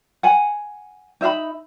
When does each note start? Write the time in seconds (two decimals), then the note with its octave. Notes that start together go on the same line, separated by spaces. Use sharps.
0.23 F#5 G#5
1.21 D#4 E5 F5 B5